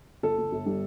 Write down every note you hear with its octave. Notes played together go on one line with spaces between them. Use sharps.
G1 A4
G1
G1
G3